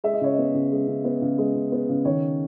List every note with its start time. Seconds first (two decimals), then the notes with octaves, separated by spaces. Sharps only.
0.04 G#3 E5
0.13 D#5
0.21 C#3 C#5
0.33 D#5
0.38 B3
0.54 C#3
0.72 G#3
0.88 C#3
1.05 B3
1.22 C#3
1.38 G#3
1.55 C#3
1.72 B3
1.89 C#3
2.05 D#3 C#5